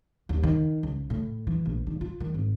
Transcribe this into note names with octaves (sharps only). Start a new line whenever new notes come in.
D#2
D#3
C#2
A2
E3
A#1
D#3
F4
D#3
G#1